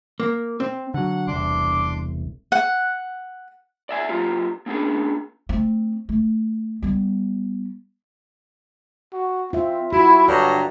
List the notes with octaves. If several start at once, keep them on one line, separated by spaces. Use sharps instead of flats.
A#3
C4
D3 F#3 F#5
E1 C2 D4 C6 D6
F#5
D5 E5 G#5
F#3 A#3 F4 G4
A#3 C#4 D4 G#4
A3 C4
A3
G3 B3
F#4
C4 F4 E5
E4 F#4 B5
G2 D3 C#5 D5 A#5